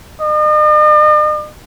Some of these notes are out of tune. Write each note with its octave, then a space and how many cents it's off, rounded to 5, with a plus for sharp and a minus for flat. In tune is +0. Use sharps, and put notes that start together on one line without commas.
D#5 -45